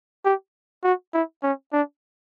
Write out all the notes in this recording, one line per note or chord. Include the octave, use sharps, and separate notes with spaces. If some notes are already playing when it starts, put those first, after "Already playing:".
G4
F#4
E4
C#4
D4